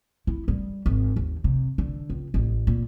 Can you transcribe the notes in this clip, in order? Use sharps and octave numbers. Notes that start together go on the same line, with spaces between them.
E4
G3
G#1
D#2
C3
D3
C#2
A1
A#2